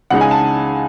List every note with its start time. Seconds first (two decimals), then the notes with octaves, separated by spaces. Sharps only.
0.10 C#2 C#3 G#3 D#4 F#5
0.21 G#5
0.31 A5